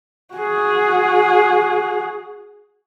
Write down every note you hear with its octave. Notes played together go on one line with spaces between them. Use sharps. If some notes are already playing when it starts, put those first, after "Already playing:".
F#4 G#4